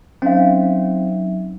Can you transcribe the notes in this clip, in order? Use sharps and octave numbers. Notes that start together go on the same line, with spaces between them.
F#3 C4 C#4 D#4 E5 F5